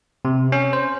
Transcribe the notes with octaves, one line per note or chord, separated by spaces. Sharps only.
C3
C#4
C5